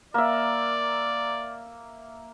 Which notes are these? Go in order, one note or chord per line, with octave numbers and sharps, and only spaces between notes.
A#3 D5 E5